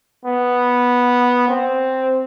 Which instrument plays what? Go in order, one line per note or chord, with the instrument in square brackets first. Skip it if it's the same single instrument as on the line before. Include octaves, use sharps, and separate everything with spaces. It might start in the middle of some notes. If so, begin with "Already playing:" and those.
[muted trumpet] B3
C4